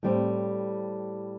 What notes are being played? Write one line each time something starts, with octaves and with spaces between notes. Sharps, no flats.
A2 G3 C4